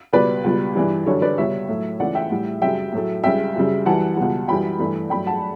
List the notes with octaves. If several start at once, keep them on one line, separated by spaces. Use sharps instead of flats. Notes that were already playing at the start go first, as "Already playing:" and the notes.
C#2 B2 G3 B4 D5
C#2 B2 G3
G2 E3 G3
F#2 D3 G3 A4 C#5
B4 D5
C#2 B2 G3 C#5 E5
A2 F#3 A3
C#2 C#3 E3 A3 D5 F#5
E5 G5
A2 G3
F#2 C#3 G3 E5 G5
A2 F#3 A3
C#2 C#3 G3 E5 G5
F#2 C#3 G3
F#2 E3 G3 F#5 A5
C#2 B2 G3
F#2 E3 G3 G5 B5
G2 E3 A3
G2 F#3 A3 G5 B5
F#5 A5